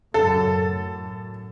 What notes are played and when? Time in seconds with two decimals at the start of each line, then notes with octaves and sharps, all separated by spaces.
0.14 F#2 A2 C#3 A4
0.60 F#2 A2